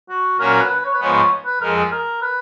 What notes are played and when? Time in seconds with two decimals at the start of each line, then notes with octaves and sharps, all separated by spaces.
0.09 F#4
0.38 A#2 F#3 C#4 F#4 A#4
0.49 A#4
0.59 B4
0.70 B4
0.84 C#5
0.94 B4
1.00 G#2 F3 G#3 B3 C#5
1.45 B4
1.61 F2 F3 G#3 A#4
1.76 G#4
1.91 A#4
2.22 B4